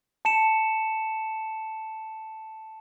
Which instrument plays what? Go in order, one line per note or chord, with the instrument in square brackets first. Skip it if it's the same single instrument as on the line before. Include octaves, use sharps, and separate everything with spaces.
[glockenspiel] A5 C#7 E7